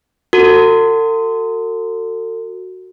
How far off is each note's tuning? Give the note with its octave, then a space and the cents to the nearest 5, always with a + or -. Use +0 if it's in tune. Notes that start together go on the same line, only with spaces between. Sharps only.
F#4 +0 A4 +40